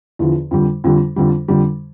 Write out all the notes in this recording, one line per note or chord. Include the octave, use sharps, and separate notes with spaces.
E2 D3 F3
F2 D3 G3
F2 D3 G3
F2 D3 G3
F2 D3 G3